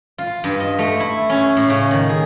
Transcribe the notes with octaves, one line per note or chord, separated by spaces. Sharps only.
F4
G2
D#5
A3
E4
C#4
A2
C#3
D#3
G#4